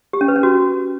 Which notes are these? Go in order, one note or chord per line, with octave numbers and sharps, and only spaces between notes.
G4
C#4
B4
C#4
F#4